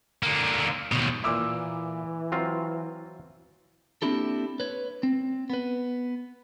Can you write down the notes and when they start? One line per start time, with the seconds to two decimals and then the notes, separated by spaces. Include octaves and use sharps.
0.23 D3 A#3
0.92 D#2 B2
1.24 A#2 E3 A#3 E4 D6 E6
2.32 F#3 C4 F4
4.02 A#3 C4 D4 E4 G4 A4
4.60 B4 C#5
5.03 C4
5.50 B3 B4